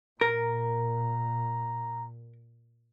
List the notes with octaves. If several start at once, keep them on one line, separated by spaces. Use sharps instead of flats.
A#2 A#4 A#5